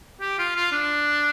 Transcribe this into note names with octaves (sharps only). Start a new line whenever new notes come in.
G4
F4
F4
D4